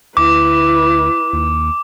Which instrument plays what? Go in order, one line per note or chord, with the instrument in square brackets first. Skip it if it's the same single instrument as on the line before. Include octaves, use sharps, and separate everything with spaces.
[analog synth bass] D2 [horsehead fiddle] E4 B4 [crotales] D6
[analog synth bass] D#2